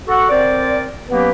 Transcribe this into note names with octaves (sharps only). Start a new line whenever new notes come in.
F#4 A4 F#5
C4 A#4 C5 D5
F#3 A#3 B3 C#4 G4 B4